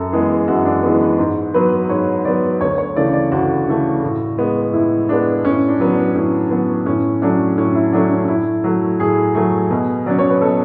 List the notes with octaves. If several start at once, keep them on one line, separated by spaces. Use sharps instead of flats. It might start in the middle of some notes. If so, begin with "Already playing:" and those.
Already playing: F#2 A4
E3 G#3 B3 G#4
F#2 F#4
D4
E3 G#3 B3
B4
G#2
F#3 B3 B4
G#2 C#5
F#3 B3 D5
D2 C#5
C#5
C#3 E3 A3 D5
D5
D2 F#4
C#3 E3 A3
A2
G#3 B3
A2 E4
G#3 B3 D4
A2 C#4
D4
F#3 B3
D4
A2 C#4
F#3 B3
A2 C#4
F#3 A3 C#4 D4
A2 C#4
E4
F#3 A3 C#4 D4
C#4
A2 E4
F#3 A3
A2 G#4
F#3 A3
B2
F#3 C#4 D5
C#5
B4
B2 A4